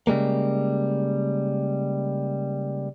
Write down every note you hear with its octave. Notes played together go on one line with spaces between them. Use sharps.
C#3 G3 G#3 A#3